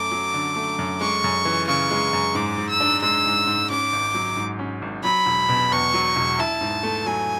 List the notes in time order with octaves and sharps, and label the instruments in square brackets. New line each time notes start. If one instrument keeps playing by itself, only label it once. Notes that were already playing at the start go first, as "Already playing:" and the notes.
Already playing: [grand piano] F#2 A3 [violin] D6
[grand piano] F#3
D3
A3
F#2
[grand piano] G#3 [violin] C#6
[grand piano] F#2
E3
[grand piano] C#3 [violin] C#6
[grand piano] G#3
F#2
[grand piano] G#2 [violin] D6
[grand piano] G#2
[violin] E6
[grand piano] D4
[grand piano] G#3 [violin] E6
[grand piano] G#2
G#2
[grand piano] C#4 [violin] D6
[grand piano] G#1
F#3
G#2
C#4
G#1
[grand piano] F#3 [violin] B5
[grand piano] E1
B2
[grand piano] E2 [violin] C#6
[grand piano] F#3
E1
[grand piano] E4 [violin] A5
[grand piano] G#2
A3
[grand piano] F#3 [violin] G#5